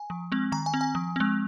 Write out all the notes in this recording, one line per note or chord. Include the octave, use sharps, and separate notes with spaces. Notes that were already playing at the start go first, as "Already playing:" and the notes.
Already playing: G#5
F3
G#3 C4
D#3 A#5
G#5
C4
G#5
F3
G#3 C4